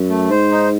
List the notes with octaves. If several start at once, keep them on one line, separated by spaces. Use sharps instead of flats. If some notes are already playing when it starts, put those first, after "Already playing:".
Already playing: F#2
A3
G#2 C5
D#4